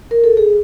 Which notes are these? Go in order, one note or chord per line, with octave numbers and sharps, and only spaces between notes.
A#4
A4
G#4